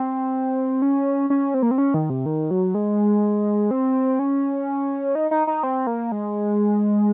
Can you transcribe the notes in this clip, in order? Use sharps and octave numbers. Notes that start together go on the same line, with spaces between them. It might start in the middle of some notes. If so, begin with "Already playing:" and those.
Already playing: C4
C#4
C#4
C4
A#3
C4
C#4
D#3
C3
D#3
F#3
G#3
C4
C#4
D#4
D#4
D#4
C4
A#3
G#3